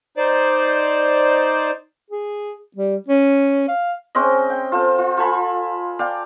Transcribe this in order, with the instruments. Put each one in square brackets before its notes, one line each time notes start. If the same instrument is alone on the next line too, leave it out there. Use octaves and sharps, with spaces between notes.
[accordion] D#4 C5 D5
[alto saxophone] G#4
G3
C#4
F5
[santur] G#3 C4 C#4 D#5
G5
F4 A4 C5
F4
F4 A4 G#5 B5
D5 F5 G5